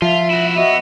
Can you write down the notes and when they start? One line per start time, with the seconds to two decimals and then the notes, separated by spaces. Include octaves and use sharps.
0.02 F3 F4 E5
0.30 E4 F#4
0.56 B3 F#4 D#5 E5